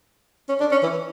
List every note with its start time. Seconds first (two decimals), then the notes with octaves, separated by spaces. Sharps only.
0.49 C#4
0.60 D4
0.71 C#4
0.83 E3